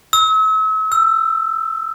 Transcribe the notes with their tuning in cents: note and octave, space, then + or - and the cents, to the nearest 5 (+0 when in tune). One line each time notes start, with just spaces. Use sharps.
E6 -40
E6 +15